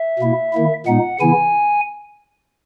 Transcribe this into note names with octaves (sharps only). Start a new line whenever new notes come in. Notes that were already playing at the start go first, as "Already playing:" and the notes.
Already playing: E5
B2 A#3 E4
D#3 A#3 E4
A#2 G#3 B3 D#4 F#5
C#3 E3 B3 E4 G#5